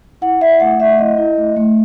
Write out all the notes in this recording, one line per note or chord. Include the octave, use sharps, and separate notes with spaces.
E4 F#5
E4 E5
A3 F#5
A3 E5
E4 D#5
E4
A3
A3